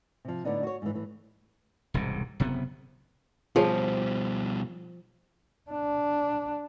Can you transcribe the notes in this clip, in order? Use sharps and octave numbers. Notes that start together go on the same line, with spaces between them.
C3 F3
A2 D3 B3 D4 D#4
F#4 C#5
G#2 E3
A2 E3
E1 C2 G#2 C3
F#1 C3 B3
B2 F3 G3 F4 G#4 C#5
D4